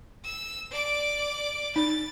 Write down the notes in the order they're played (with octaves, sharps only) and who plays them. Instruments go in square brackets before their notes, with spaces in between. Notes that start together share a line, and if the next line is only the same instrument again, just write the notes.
[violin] E6
D5 D6
[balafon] D#4 [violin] A6